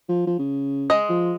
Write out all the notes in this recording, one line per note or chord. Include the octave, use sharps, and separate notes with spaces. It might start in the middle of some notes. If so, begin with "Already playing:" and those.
F3
F3
C#3
G#3 D#5
F3